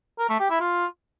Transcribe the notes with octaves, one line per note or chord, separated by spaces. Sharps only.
A#4
A3
G4
E4
F4